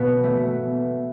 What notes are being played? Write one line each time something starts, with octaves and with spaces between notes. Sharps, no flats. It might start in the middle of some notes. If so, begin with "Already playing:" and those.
Already playing: B2 B3
A3